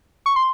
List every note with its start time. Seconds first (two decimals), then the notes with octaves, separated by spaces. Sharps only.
0.26 C#6
0.36 C6